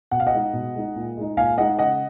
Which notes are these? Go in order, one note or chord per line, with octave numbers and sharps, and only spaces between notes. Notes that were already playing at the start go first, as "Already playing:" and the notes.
B2 F#5
F5
D#5 F#5
G#3 D#4
B2
G#3 D#4
A#2
G#3 D#4
A#2 F5 G#5
G#3 D#4 D#5 F#5
C#3 D#5 F#5